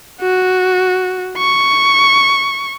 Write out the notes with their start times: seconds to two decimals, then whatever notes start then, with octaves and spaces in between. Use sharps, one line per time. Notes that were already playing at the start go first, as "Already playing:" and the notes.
0.21 F#4
1.37 C#6